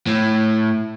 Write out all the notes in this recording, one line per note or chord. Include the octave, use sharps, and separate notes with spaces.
A2